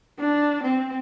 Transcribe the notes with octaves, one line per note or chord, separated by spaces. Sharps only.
D4
C4